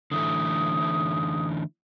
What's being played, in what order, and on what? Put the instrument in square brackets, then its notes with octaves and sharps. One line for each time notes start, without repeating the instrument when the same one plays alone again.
[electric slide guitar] D3 E3 A3 [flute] D#6